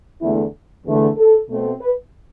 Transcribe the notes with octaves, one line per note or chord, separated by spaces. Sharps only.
E2 D3 A3 E4
E2 D3 A3
A4
B2 A3 C4
B4